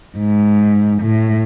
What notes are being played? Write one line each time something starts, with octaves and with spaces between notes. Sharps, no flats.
G#2
A2